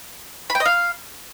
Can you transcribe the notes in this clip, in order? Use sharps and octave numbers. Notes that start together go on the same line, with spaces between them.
B5
G5
D#5
F5